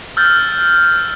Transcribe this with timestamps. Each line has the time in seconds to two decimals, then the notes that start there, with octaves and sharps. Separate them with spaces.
0.17 E6 F6 G6 A6